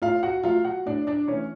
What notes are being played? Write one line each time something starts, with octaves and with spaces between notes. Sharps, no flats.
A2 F4 F5
F#4 F#5
F#3 A3 F4 F5
F#4 F#5
A2 D4 D5
D4 D5
E3 A3 C#4 C#5